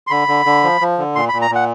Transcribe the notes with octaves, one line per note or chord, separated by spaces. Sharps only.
C6
D3 B5
D3
D3
F3
F3
D3
A#2 C6
A#2 B5
A#5
A#2 F#5